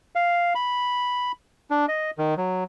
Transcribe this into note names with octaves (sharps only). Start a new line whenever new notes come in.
F5
B5
D4
D#5
D#3
F#3